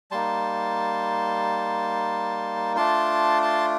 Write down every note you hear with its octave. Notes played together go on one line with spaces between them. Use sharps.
G3 A#3 D#4 A5 C6
A3 D4 F4 A5 C6
A5 C6